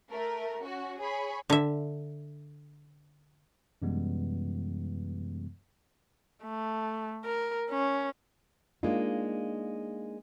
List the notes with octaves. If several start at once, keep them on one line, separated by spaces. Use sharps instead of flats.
A3 A#4
C#4 F#4
G#4 C#5 B5 C#6
D3 E5
F#2 C3 E3 G3 G#3 B3
A3
A#4
C#4
G#3 A#3 D4 D#4 F4